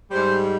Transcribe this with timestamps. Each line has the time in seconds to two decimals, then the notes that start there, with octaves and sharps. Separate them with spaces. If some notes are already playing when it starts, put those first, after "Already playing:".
0.10 G#2 G3 C5